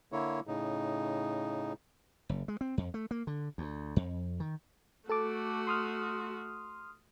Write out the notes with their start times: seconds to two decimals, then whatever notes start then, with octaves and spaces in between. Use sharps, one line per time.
0.12 D3 A#3 E4 C#5
0.47 A2 C#3 D#4
2.29 F#1
2.48 G#3
2.61 C4
2.78 F2
2.94 A3
3.11 A#3
3.27 D3
3.58 D2
3.96 F2
4.40 D#3
5.09 A3 F#4 A4 A5 D6
5.67 C6 D#6 F6